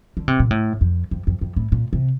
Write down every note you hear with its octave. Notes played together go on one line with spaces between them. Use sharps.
D3
C3
A#2
A2
F2
F2
F2
F2
A2
A#2
C3